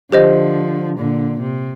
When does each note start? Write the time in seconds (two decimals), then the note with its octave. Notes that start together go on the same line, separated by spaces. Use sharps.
0.11 D3 F3 G4 C5 D#5
0.97 A#2 D3
1.40 C3